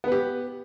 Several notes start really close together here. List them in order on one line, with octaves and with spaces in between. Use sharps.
B3 B4 G4